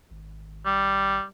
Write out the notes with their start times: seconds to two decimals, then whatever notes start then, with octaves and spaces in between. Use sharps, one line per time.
0.11 G#1
0.66 G3